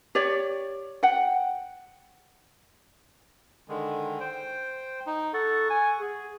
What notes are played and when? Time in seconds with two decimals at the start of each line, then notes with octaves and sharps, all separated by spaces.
0.15 G4 C#5 D5
1.03 F#5 G5
3.68 D3 D#3 G#3
4.20 C5 G5
5.07 D#4
5.34 A4 F#5 C#6
5.70 G#5
6.00 G#4